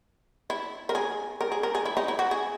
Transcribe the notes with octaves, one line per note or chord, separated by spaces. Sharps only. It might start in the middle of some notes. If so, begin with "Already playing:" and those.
E4
A#4
G#4
A#4
G#4
A#4
G#4
E4
D#4
E4
F#4
G#4